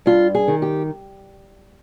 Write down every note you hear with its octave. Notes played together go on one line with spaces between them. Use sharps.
G2 F4
G#4
D#3
G4